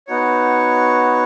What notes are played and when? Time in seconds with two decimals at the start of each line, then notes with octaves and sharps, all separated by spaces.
0.08 B3 D#4 F#4 C#5